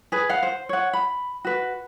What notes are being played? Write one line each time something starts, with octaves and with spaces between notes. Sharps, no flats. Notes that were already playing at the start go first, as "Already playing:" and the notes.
G#4 B4
F5 F#5
C5
C#5 F#5
B5
F#4 B4